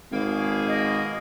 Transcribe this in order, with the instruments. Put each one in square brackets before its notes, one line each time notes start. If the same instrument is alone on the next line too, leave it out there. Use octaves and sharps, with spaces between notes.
[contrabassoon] G#1 [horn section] B2 A#3 G#4
[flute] D#5